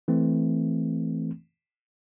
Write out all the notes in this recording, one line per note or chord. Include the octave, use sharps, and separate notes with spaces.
E3 A3 C4